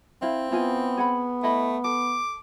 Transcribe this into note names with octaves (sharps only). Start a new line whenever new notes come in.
C4 E4 F5
B3 E4 F4 G#5
G#4 F#5 B5
A3 E4 D#5 B5
A4 D6